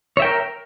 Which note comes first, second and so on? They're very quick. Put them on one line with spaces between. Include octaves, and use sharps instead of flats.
C#5 E5 G5 A#4